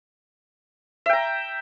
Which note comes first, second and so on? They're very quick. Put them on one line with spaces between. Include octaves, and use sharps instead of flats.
E5 G5 A#5